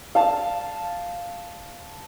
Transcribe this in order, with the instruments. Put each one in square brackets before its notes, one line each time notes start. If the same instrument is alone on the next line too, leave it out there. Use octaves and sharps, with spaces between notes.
[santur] F5 A5